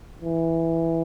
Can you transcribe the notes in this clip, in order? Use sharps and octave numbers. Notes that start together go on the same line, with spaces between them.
E3